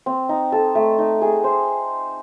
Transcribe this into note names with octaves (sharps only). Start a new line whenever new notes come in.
C4
D#4
A4
A3
D#4
G#4
C5